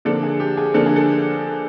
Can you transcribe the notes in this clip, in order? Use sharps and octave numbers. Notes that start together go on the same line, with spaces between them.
D3 F3 A#3 D4 A4
G#4
G4
G#4
D3 F3 A#3 D4 A4
G#4
A4